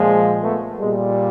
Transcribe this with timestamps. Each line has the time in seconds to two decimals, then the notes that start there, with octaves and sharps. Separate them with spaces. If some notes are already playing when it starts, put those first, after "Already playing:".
Already playing: A#2 F3 G#3
0.42 A3 B3
0.78 A#2 G3 G#3